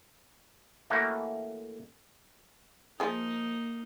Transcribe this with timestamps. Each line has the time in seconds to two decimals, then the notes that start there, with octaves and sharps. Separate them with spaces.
0.90 E3 A3 A#3 C#4 F#4
3.00 F3 A#3 D#4 G#4